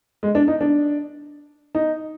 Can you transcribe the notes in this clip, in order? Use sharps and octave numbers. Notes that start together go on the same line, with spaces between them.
G#3
D4
D#4
D4
D#4